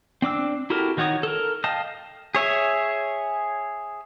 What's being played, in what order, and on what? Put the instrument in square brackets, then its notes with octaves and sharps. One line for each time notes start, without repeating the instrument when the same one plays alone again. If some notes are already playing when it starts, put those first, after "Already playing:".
[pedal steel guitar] C4 D4 D6 E6
E4 F#4 G4 A4 A#4
D#3 D#4 F#4 C#5 D#6
A4 A#4
D#5 F5 G5 A5 D#6
G#4 C#5 E5 G#5